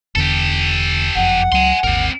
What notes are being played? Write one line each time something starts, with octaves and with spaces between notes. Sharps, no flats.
E1 E2 D3 G4 A4
F#1 F2 F#5
C#2 F#3 G#5 C6
G#1 D#2 C4 A#4